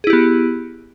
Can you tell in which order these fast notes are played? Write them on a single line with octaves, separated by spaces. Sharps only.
G#4 E4 G4 B3